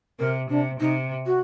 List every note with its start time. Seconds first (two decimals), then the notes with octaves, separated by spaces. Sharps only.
0.19 C3 A#4
0.50 C3 D4
0.80 C3 D#4
1.26 F#4